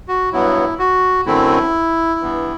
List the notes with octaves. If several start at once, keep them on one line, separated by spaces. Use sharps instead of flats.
F#4
G2 F#3 B3 E4
F#4
F#2 D3 A3 C4 E4
G2 E3 B3